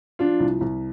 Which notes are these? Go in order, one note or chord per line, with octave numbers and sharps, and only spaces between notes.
F3 D4 F4
C2
C2